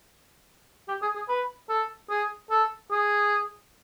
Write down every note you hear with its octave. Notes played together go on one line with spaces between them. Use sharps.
G4
G#4
G#4
B4
A4
G#4
A4
G#4